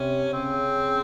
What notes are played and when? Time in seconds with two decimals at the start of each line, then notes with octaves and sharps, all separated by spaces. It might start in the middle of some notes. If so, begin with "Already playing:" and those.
Already playing: C3 C#4
0.33 C#3 C4